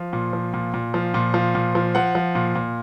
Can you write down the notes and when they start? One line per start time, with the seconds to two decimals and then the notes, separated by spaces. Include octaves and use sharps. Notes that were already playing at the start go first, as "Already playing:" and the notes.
Already playing: F3
0.13 A#2
0.33 F3
0.54 A#2
0.74 A#2
0.94 F3
1.14 A#2
1.34 F3
1.55 A#2
1.75 F3
1.95 F3 F#5
2.15 F3
2.35 A#2
2.55 A#2